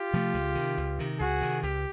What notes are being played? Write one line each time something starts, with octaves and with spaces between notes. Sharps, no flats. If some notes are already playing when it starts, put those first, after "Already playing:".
Already playing: F4 G4
C3 F3 A3
C#2
C3 D#3
C#2
C3 D#3
C#2 F#4 G#4
C3 D#3
C#2 G4